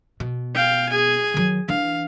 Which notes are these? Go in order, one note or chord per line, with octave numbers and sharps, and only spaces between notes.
B2
F5 G5
G#4 G#5
D#3 F#3
E3 D4 F5